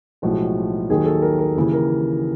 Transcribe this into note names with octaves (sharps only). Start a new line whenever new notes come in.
B1 A2 F3 G#3 F#4
D#2 D#3 F#3 G#4
A4
A#4
A#4
D#2 C#3 E3
A#4